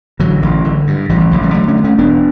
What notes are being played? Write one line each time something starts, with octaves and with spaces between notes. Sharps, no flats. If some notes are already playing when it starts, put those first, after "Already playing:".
A1 D3 F#3
A1
D3
G2
A1 E3 G3
E3
A1 D3 F#3
E3 G3
D3 F#3 A3
A3 C#4
G2
A3 C#4
E1 B3 D4